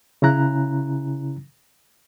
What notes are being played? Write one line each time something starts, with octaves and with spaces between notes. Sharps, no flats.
C#3 C#4 E4 A#5 F#6